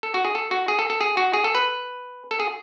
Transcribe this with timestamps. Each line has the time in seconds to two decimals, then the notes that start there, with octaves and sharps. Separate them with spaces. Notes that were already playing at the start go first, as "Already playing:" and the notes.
0.03 A4
0.14 F#4
0.25 G#4
0.35 A4
0.51 F#4
0.68 G#4
0.79 A4
0.90 A4
1.01 G#4
1.17 F#4
1.33 G#4
1.44 A4
1.55 B4
2.31 A4
2.40 G#4